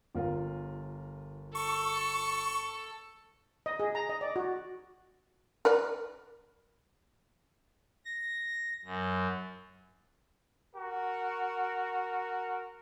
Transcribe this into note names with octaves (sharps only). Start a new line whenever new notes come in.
G1 F4 A#4
A4 C#6
D#5
G#4
A#5
D#5
D5
F#4
A#4 B4 D5
A#6
F#2
F#4 A#4